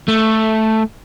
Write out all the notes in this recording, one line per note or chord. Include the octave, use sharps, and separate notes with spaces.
A3